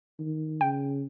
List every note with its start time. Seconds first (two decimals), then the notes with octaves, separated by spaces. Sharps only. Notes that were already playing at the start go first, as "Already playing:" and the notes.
0.19 D#3
0.61 C#3 G5